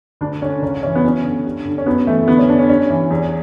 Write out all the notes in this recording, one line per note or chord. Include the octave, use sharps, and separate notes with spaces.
D2 D4
D3 C#4
C#2 C#4
C#3 E3 C#4
B3
F#2 C#4
D3
G2
D3
C#4
F#2 B3
E3 A3
D2 B3
C#4
D3 D4
C#4
G2 C#4
E3
E2